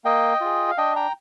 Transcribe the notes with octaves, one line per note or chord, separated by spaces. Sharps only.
A#3 D#5 G5
F4 G#4
F5
D4 D#5 G5
G5 A#5